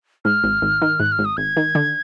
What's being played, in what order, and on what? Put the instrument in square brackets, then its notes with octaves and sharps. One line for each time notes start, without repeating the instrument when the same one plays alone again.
[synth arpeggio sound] G#2 [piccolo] F6
[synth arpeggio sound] G#1
G#1
D#3
[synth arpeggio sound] G#2 [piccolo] F#6
[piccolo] F6
[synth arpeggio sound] G#1
[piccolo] D#6
[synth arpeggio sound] G#1 [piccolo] G#6
[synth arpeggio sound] D#3
D3